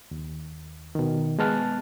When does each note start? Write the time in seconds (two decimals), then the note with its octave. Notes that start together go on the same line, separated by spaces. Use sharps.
0.11 D#2
0.95 B2 D#3
1.39 G#3 B3 A5 F6 F#6